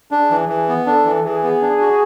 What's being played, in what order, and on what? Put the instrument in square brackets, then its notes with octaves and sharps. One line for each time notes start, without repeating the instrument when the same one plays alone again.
[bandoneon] D4 [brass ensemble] G#4
[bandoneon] E3
E3
B3
[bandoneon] D4 [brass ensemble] A4
[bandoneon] E3
[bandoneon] E3 [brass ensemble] G#4
[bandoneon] B3
D4
F#4